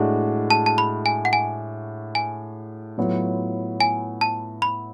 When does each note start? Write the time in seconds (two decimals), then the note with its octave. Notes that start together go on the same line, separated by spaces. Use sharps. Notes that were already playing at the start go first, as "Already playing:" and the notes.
Already playing: A2 G#3 D4 F#4
0.50 A5
0.66 A5
0.78 B5
1.06 G#5
1.25 F#5
1.33 G#5
2.15 G#5
2.98 A2 F#3 B3 F4
3.80 G#5
4.21 A5
4.62 B5